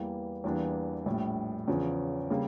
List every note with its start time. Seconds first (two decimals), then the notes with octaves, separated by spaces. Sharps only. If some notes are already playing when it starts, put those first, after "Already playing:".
Already playing: E2 E3 G3 A#3
0.44 E2 E3 G3 A#3 D4
1.06 A#1 A2 G3
1.68 E2 C#3 F3 C#4
2.30 C#3 G3 A#3